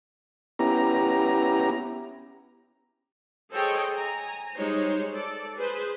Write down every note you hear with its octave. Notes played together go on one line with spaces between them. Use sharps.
B3 C#4 E4 G4 A#5
G#4 A4 C5 C#5 D#5 G5
G#5 A#5
G3 G#3 D#4 C5 C#5
A4 D5
G#4 B4 C5